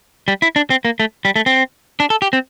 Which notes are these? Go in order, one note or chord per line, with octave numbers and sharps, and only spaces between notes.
G3
E4
D4
C4
A#3
A3
G3
A3
C4
D4
A4
G4
C4